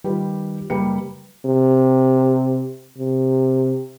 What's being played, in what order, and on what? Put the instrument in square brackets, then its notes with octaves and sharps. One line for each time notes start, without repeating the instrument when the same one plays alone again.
[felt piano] D#3 G3 F4 G4 B4
F#1 G3 A#3 B4 B5 C#7
[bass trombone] C3
C3